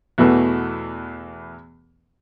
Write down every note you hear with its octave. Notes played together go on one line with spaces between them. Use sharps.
E2 B2 E3 A3